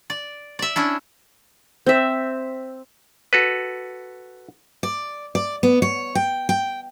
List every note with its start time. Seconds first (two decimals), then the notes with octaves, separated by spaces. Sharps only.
0.10 D5
0.59 D5 E5
0.76 C#4 D4 E4
1.86 C4 E5
3.33 F#4 A4 B4
4.83 D5
5.35 D5
5.63 B3
5.82 C#5
6.15 G5
6.49 G5